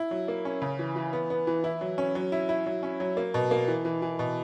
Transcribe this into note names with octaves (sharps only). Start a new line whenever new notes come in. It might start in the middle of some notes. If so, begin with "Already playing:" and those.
Already playing: E4
F#3
A#3
C#4
C#3
E3
E3
B3
B3
E3
E4
F#3
C#4
F#3
E4
E4
F#3
C#4
F#3
A#3
B2
A#3
E3
E3
E3
B2